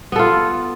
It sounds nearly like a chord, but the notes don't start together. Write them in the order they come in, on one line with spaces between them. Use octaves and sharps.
B3 A4 F4